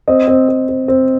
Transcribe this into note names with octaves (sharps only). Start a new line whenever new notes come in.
C4 D#5
C4
C4
C4
C4